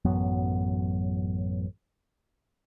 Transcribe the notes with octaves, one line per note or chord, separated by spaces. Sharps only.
A1 F#2 F#3 B3